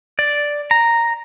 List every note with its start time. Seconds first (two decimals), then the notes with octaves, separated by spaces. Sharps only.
0.19 D5
0.71 A#5